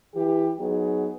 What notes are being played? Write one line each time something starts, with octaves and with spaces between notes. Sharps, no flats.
E3 G4
F#3 B3 D#4 G#4